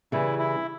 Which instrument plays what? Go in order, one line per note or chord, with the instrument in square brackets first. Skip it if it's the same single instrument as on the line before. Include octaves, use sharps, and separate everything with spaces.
[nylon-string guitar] C#3 E3 G3 [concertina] E4
[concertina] E4